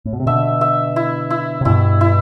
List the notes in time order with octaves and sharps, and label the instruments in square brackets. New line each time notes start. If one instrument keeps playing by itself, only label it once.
[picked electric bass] A2
B2
C3
[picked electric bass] B2 D3 [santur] E5
[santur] E5
E4
E4
[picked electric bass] C3
[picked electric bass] G2 B2 [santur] E4
[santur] E4